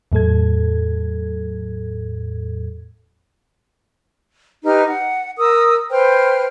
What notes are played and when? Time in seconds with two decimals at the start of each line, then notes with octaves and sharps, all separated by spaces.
0.12 E2 A2 F#3 A4 G#6
4.65 D#4 G4 B4 F6
4.87 F#5
5.39 A#4 D#6 E6
5.91 B4 C5 G5 F6